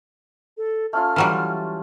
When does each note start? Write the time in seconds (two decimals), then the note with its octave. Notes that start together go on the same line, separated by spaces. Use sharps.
0.58 A4
0.93 A3 C#4 F4 F6
1.16 E3 F#3 G3